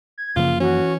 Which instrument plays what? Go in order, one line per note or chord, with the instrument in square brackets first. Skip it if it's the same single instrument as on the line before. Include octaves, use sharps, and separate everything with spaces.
[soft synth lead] G#6
[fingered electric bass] F#2 F3 A#3 [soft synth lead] C#3 [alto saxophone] F4
[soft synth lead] E3 [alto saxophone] C#4 [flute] F#4